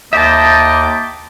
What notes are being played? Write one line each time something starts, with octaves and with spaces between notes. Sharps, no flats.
D#2 D#5 E5 A5 D6 G6